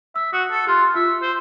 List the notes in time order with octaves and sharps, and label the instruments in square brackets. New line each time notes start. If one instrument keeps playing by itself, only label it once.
[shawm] E5 [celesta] E6
[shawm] F#4 [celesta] D#6 F#6
[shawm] A4
[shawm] F4 [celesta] G4 C6 F#6
[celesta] F4 [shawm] E5
[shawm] C5